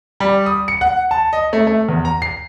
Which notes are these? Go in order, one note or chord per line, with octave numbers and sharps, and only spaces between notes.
G3
D#6
C#7
F#5
A5
D#5
A3
A3
E2
A#5
C7